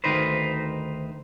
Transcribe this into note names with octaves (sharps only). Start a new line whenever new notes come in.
D2 B2 D#3 D#4 B4 C5